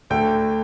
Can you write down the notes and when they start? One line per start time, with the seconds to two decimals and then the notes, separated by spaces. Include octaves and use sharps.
0.10 D2 D3 A3 G5